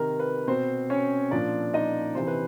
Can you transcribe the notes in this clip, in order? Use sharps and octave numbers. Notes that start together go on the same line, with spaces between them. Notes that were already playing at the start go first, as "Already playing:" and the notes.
Already playing: C3 D#3 A#4
B4
B2 C4 C5
C#4 C#5
A#2 F3 D4 D5
D#4 D#5
C3 E3 C5
B4